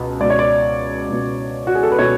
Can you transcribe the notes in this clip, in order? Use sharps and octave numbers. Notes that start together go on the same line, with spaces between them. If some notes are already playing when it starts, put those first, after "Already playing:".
Already playing: C#2 B2
C#2 B2 D5
C#5
D5
C#2 B2
F#4
G#4
A4
B4
B2 C#5